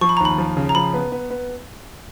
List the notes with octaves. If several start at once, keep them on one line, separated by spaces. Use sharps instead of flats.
F3 C#6
B5
A#5
D#2 B5
F3
C#3
A#5
F3 B5
B3
B3
B3